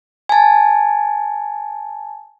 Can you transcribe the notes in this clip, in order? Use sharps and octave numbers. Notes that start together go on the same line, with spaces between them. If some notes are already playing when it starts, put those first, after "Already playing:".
G#5 A5